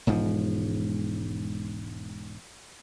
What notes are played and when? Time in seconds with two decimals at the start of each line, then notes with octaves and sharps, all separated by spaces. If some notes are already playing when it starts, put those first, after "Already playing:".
0.07 E1 G#2 F3